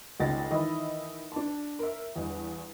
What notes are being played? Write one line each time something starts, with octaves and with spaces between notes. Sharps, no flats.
G#1 C#2 G2 C#3 A6 A#6
D#3 E3 D#5 E5 B5
D4 A5
A#4 E5
E2 G2